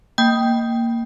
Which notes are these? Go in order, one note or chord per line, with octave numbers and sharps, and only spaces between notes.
A#3 G5